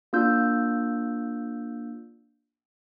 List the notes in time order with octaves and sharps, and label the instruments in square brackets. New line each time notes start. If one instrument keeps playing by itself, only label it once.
[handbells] A#3 D4 F4 E6 G6